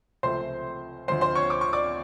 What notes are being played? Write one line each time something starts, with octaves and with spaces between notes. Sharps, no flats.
C#2 C3 F3 A3 C5 C6
D2 D3 F3 G#3 C5 C6
C5 C6
C#5 C#6
D6
C#6
D5 D6